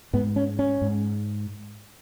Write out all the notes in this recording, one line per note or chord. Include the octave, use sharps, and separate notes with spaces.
G#2 B3
C#4
C#4
G#2